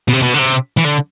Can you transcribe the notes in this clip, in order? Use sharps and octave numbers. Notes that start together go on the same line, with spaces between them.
B2
C3
B2
D3
C3
E3
D3